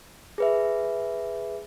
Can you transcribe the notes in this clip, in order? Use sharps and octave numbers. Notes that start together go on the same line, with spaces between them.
G#4 B4 E5